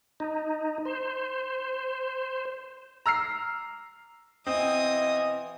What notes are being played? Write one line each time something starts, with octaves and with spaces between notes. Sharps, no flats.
D#4
C5
A#5 E6 F6 C7
B2 E3 C4 D#5 G#5 D#6